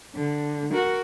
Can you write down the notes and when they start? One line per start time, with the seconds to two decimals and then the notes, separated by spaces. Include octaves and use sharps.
0.16 D3
0.72 F#4 A#4